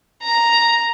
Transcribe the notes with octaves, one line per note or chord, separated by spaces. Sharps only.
A#5